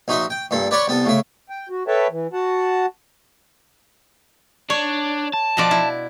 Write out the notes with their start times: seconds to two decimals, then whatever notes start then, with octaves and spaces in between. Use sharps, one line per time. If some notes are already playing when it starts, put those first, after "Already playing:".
0.08 A#1 D#4 F#4 E5 C6
0.30 G5
0.51 G2 A#2 A4
0.71 B4 C#5 D5 F#5 C6 C#6
0.88 C2 B3 A4
1.05 A2 C#3 E5
1.50 G5
1.69 F#4
1.88 A4 B4 C#5 E5 G5 A5
2.10 E3
2.33 F#4 F#5 A5
4.70 D4 C#5
5.33 A5
5.57 B2 F3 D5
5.71 E4